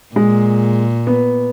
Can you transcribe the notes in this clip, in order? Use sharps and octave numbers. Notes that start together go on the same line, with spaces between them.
A#2 G#3
B3